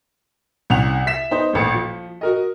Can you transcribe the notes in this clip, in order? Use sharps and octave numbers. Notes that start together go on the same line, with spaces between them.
C2 C#4 F#5 F7
E5 B6 E7
B3 D#4 C5
D#1 A1 C#7
F3
F#4 A#4 D#5